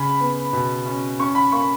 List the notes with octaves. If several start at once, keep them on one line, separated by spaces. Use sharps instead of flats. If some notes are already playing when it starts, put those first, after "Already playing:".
Already playing: C#3 B5
B3
B2
C#4
C#4 C#6
B5
A#3 C#6